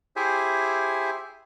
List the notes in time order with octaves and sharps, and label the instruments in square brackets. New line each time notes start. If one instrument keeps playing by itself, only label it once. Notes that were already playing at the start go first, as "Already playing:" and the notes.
[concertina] E4 G4 G#4 C5 E5 G#5